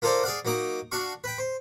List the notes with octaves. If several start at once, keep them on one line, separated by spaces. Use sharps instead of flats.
A#3 F4 A4 A#4 C5 D5
G#4 D5 F5 F#5
F#3 A#3 D#4 D6
D4 F#4 F5 C#6
B4 G5
C5